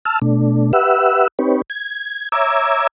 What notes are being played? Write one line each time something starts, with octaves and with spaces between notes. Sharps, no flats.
A5 E6 F6
B2 A3 D4
G4 B4 E5 F#5 E6
C4 D#4 G4 B4 C#5
G#6
C#5 E5 A#5 D6 E6 G#6